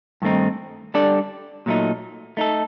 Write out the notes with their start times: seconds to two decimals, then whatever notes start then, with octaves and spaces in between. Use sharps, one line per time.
0.22 G2 D#3 A3 C4 D#4
0.94 G3 D4 A4 D5
1.66 A#2 F#3 A3 D#4
2.37 A3 D#4 A4